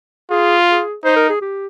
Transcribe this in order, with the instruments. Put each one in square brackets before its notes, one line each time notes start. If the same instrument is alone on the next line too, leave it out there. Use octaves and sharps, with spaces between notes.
[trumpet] F4 [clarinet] G#4
[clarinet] G#4
[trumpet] D#4 [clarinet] C5
[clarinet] A#4
G#4
G4